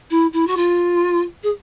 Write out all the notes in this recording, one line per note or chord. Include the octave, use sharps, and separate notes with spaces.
E4
E4
F#4
F4
G#4